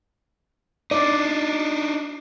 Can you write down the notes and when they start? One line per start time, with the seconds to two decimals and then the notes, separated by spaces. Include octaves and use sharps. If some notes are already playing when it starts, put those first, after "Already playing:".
0.91 D4 D#4 D5